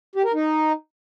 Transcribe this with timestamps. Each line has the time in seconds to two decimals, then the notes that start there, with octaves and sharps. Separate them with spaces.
0.15 G4
0.25 A#4
0.34 D#4